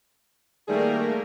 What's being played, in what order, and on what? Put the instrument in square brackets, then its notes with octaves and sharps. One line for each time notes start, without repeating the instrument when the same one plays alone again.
[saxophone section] D#3 G3 G#4 [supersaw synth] A3 A#3 A#4